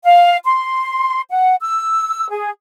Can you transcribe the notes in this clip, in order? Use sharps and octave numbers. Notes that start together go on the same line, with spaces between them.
F5
C6
F#5
E6
G#4